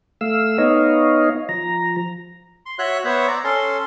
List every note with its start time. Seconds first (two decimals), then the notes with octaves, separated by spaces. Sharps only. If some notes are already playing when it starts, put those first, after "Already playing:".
0.21 A3 F5 E6
0.58 B3 D#4 C#5 D#5 F5
1.49 F3 A#5
2.66 C6
2.79 F#4 C#5 E5 F#6
3.05 B3 C5 C#5 E5 F#5
3.28 D5 A#5
3.44 C#4 A4 C6